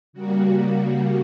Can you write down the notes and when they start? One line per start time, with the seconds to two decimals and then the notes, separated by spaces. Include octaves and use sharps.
0.13 C#3 G3 A#3 F#4
0.61 C#3 G3 A#3